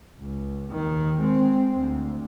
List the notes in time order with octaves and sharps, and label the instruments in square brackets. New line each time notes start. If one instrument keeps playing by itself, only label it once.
[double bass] C#2
D#2 D#3
G#3 C4
D2